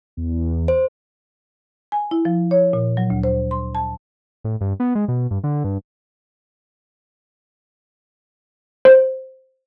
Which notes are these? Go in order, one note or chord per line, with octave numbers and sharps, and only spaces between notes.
E2
C5
G#5
E4
F3
C#5
A#2
F#3
D2
C5
C6
A5
A2
G2
B3
G#3
B2
G2
D3
G2
C5